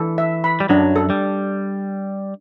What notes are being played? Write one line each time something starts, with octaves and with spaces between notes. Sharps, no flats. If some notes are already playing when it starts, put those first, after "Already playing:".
Already playing: E3 A4
E5
B5
G3
F#2 F#3 D4
A4
G3